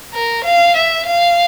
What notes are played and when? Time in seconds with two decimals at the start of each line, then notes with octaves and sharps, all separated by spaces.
0.14 A#4
0.44 F5
0.76 E5
1.06 F5